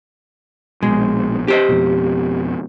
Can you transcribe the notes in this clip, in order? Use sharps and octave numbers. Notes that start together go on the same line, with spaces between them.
A#1 B2 G#3
G4 C5 D#5
F2 B2